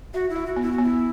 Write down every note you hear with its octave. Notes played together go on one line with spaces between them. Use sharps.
F#4 E5
E4
E5
F#4
B3
E4
F#4
B3 E4